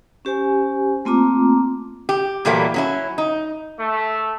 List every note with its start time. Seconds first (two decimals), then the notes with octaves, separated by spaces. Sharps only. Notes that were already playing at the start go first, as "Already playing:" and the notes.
0.25 C#4 G4 C5 G#5
1.05 A3 A#3 C4 F4 A#5 D6
2.09 G4
2.45 A#2 E3 F#3 G3 A3 A#3
2.74 F#3 C#4 E4
3.18 D#4
3.78 A3